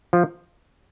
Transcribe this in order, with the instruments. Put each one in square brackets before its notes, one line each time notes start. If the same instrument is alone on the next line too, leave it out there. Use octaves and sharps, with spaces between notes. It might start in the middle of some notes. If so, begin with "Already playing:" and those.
[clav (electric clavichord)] F3